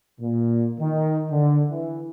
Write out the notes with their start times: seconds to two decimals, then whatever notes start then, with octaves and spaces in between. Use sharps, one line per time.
0.19 A#2
0.79 D#3
1.31 D3
1.70 E3